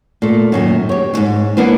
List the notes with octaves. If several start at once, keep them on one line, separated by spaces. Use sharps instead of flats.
A#2 A3
F#2 A#2 D#3
G4 C#5
D#2 G#2
E3 A#3 B3 D4